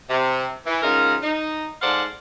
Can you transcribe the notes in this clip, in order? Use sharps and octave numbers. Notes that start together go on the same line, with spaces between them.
C3
E3
G#2 C#3 D#4 F4 A#4
D#4
G#2 A4 C5 D5 F5 F#5